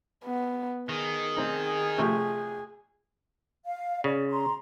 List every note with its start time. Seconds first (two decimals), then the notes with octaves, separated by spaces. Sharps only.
0.25 B3
0.89 D#3 G#4
1.37 C4 D#4 G#4
1.98 C3 F3 A3
3.65 F5
4.04 C#3 D5
4.29 A#5 C6